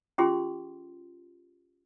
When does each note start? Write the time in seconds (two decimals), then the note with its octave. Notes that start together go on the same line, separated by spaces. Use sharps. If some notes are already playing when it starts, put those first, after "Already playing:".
0.18 C#4 F4 G4 G#4 C6